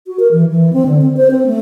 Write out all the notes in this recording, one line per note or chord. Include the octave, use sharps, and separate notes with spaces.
F#4
A#4
E3
E3
C4
D3
C4
C5
C4
A3